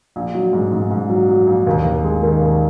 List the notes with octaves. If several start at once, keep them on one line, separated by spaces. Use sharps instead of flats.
A#1
F#3
G#2
G#2
G#2
F#3
F#3
A#1
D#2
D#2
G#3
D#3
D#2